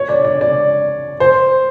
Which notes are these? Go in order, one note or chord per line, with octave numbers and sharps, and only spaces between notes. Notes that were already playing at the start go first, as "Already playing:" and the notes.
Already playing: C#5
D5
D5
D5
C5